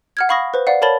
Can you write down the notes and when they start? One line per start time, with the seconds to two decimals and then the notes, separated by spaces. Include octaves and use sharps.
0.17 F#5 F6 G#6
0.29 F5 B5 C#6 D#6 A#6
0.54 B4 C5
0.67 D5 F5 F#5
0.82 A#4 C#5 A5 B5 A6 G7